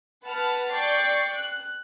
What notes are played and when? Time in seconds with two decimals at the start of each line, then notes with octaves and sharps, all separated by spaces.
0.25 B4 F#5 A5 B5 F6
0.72 D5 G5 C#6 C7
1.34 F#6